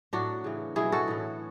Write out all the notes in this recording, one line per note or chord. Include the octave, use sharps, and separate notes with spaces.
A2 F#3 D4 F#4
C#3 E3
B2 F#3 E4 G#4
F#4 A4
A2 E3